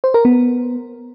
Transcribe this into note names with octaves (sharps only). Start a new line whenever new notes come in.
C5
A#4
B3